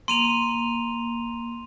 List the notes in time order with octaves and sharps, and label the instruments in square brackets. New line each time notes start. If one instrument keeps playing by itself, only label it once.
[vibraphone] A#3 [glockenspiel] C6 D#7 F7